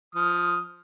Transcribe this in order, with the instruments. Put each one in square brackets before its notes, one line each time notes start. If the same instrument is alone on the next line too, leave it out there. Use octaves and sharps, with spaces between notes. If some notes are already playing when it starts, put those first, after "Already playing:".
[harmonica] F3 D#6 F6